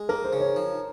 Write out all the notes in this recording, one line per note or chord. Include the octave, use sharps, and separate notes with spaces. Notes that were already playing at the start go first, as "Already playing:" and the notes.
Already playing: G#3
A#3 A#4
C5
C#3
C#5
F3